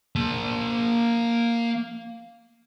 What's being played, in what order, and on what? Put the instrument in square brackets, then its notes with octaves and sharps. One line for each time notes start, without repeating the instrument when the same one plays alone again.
[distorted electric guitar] A#3 A5